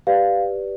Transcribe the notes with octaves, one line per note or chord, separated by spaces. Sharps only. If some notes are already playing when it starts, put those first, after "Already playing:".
G4 B4 D5 F5